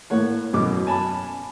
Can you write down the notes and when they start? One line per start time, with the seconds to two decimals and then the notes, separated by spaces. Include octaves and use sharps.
0.10 A2 A#3 C#5 F#5
0.53 F#2 B2 D6
0.87 G#5 A5 B5